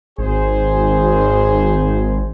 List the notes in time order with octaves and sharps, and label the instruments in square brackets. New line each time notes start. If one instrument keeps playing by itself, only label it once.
[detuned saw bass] G#1 [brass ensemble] G#4 C5